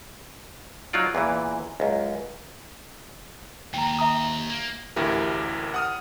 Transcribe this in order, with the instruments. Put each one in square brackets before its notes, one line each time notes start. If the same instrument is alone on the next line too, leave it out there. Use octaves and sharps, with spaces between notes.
[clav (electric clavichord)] F#3 D#4 F4 D5
E2 A#2 E3
C#2 F#2
[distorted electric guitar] D#2 [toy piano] G5 A#5
[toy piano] E5 A#5 D#6
[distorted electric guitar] A#3
[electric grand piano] A1 D2 E4 G4 A#4
F#5 D#6 F6